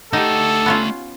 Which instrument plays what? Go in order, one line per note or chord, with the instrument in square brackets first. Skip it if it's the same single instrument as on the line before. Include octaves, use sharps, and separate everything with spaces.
[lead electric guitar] A3 F#5 [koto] D#4 G4 [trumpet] A4
[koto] B3 C#4 F4